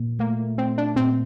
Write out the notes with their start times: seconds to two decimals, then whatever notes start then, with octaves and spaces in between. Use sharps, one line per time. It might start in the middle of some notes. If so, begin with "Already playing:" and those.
Already playing: A#2
0.19 A3 A#3
0.58 A3 C4
0.78 D4
0.96 A#2 C4